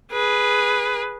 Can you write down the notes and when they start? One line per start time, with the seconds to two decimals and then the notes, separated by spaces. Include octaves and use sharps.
0.12 G#4 B4